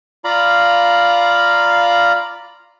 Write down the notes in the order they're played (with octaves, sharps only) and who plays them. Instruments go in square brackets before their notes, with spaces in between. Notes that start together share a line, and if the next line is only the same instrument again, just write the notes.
[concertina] F4 D5 F5 A#5 B5